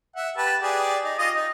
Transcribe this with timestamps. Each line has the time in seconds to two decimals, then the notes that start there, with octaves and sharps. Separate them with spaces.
0.16 E5 F#5
0.37 G4 B4 A5
0.62 G4 G#4 D5
1.05 D#4
1.19 F4 D#5 D#6
1.35 D#4